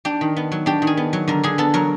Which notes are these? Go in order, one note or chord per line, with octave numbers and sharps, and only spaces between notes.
D4 G4
D#3
B3
F#3
D4 G4
D#3
G#4
B3
F#3
D3 A#4
D3 G#4
B3 A4
F#3 A#4